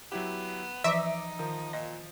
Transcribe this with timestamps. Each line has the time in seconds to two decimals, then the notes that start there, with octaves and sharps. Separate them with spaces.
0.12 F#3 B3 E4 G4
0.84 E3 F3 D#4 D5 E5 D6 D7
1.39 D#3 F3
1.73 A#2 D#5